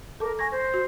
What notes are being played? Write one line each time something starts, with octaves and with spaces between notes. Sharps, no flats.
A4 A#4 A5 D6
G#5 C#6 G#6 A#6
C5
F#4